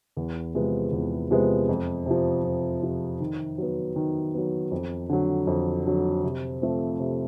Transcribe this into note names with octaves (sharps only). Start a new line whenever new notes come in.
E2
C3 F3 G#3 B3
E2
C3 F3 G#3 B3
F2
C3 F3
F2
C3 F3
D#3
F#3 B3
D#3
F#3 B3
F2
D3 F#3
F2
D3 F#3
C3
F3 A3 C4
C3